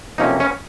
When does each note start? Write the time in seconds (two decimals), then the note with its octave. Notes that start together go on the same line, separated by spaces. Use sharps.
0.18 F2 C3 F#3 A#3 C#4 D#4
0.40 C#4